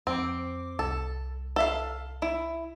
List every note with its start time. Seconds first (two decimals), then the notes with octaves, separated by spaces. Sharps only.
0.07 F2 C4 D6
0.79 C2 A4
1.56 A4 E5 F5
2.22 E4